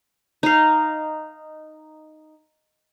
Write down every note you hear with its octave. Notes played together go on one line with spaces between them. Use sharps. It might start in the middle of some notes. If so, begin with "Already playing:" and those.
D#4 F5